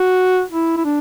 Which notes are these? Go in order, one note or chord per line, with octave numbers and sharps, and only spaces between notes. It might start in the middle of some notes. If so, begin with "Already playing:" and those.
Already playing: F#4
E4
E4
D4